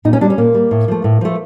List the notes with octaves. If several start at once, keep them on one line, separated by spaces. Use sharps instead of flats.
A#2 D#4
C#4
G3 D4
C#4
A#2 A#3
G3
A2
F3 A3
A2
F3 A3